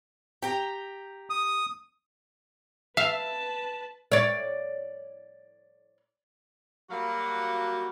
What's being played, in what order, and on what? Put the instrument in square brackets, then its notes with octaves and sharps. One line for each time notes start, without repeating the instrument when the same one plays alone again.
[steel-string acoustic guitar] G4 G5 A#5
[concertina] D#6
[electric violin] B4 A5 [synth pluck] E5 [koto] F5
[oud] C#5 D5
[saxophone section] F#3 G3 A#3 F#4 F5 F#5